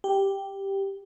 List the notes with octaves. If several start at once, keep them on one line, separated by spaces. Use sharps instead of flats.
G4